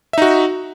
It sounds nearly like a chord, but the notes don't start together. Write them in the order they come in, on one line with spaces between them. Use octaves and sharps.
E5 D#4 F#4